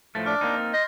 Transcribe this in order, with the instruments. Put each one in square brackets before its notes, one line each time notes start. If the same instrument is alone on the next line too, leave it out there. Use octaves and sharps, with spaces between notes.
[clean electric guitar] A2 F3 A3 [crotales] A6
[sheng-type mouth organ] D4 D6 [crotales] F6
[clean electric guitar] A#3 C4 D#4
[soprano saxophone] D#5 [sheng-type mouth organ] C6 G6